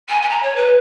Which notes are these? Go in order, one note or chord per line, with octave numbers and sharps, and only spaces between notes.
G#5
G#5
A#5
C#5
B4